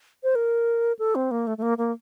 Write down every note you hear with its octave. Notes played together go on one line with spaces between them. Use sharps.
C5
A#4
A4
C4
A#3
A3
A3
A#3
A#3